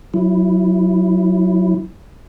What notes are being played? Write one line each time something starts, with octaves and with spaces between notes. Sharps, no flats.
F#3 E4